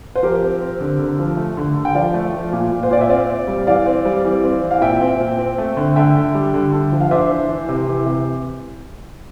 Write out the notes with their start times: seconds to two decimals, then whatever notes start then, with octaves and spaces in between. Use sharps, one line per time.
0.15 C5
0.23 F3 G4 A#4
0.42 C4
0.61 C4
0.80 D3
0.99 D3
1.19 F3
1.37 A3
1.57 D3
1.76 D3
1.85 G5
1.95 F3 D5 F5
2.14 A3
2.33 F3
2.52 A#2
2.72 A#2
2.83 C5
2.91 A#2 D5
3.01 E5
3.09 C4 D5 F5
3.29 C4
3.48 G3
3.67 E3 D5 F5
3.86 C4
4.05 G3
4.25 E3
4.44 C4
4.63 E3
4.71 F5
4.81 A#2 E5 G5
5.01 C4
5.20 A#2
5.38 C4
5.58 A3
5.77 D3
5.96 D3 E5 G5
6.15 D3
6.35 G3
6.54 D3
6.73 D3
6.92 F3
7.01 F5
7.11 D4 C5 E5
7.30 E3
7.49 E3
7.69 C3
7.88 E3
8.06 C3